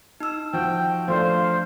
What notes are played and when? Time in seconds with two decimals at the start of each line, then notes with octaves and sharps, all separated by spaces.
0.20 D#4 E6
0.53 F3 F#4 G5
1.08 F3 A3 D4 C5 F5